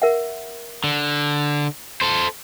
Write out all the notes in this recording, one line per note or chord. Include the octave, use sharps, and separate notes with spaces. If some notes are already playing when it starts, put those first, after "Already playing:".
A#4 E5 F#5
D3
A4 C5